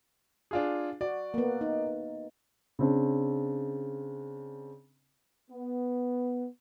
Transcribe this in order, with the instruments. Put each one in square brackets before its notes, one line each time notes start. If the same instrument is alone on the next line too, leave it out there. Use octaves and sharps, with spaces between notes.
[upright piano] D4 F4 G#4
[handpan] F#4 [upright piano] D5
[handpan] A#3 B3
D#4
[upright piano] C#3 C4 D4
[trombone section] B3